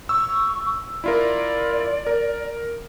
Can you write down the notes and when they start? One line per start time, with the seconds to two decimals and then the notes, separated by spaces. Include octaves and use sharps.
0.09 C#6 E6
1.04 E4 F4 A#4 D5
2.07 A#4